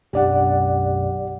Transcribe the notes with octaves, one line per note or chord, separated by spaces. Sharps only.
B1 F#2 D4 G4 D5 F#5